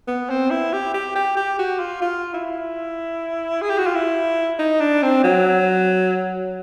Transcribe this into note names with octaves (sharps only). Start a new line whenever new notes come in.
B3
C4
E4
G4
G4
G4
G4
F#4
F4
F4
E4
G#4
G4
F#4
F4
E4
D#4
D4
C4
F#3